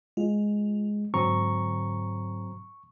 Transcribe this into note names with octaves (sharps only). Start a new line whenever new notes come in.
G#3 F4
G#2 D3 F#3 C4 A#5 C#6